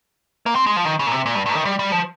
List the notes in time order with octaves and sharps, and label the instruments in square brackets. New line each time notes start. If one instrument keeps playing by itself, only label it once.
[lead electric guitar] A#3
C4
G#3
F3
D#3
C#3
A#2
C3
A#2
G2
G2
D#3
G3
G3
F3